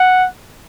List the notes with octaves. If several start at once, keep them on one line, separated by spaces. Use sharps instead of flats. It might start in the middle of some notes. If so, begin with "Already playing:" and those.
Already playing: F#5